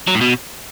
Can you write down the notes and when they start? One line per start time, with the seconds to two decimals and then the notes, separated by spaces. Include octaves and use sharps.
0.07 F#3
0.14 A2
0.21 B2